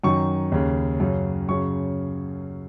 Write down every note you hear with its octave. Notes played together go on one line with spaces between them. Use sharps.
F#2 D#3 C#6
D#2 C#3
F#2 C#3
F#2 C#3 C#6